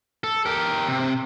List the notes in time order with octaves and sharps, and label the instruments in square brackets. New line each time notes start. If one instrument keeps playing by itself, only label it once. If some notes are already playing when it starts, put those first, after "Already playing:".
[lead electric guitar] A4
G4 A#4
C3